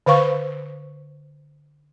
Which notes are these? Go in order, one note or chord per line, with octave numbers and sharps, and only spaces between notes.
D3 B4 C5 F5 C#6